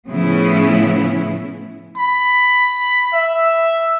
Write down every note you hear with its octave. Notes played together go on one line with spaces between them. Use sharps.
A2 C#3 F3 B3 C#4 E4
B5
E5